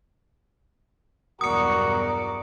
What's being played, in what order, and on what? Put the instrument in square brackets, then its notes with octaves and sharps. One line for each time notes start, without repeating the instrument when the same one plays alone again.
[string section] B1 E2 G2 [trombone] F#4 [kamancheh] A#4 D5 [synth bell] D#6 C#7